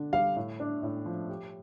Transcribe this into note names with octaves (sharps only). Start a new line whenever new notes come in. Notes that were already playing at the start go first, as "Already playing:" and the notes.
Already playing: D3 D4
G3 F5
A2
D4
A2
F3
G4